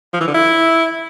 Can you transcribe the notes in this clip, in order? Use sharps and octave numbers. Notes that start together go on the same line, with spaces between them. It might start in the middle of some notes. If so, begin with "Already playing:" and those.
F3
E3
D3
E4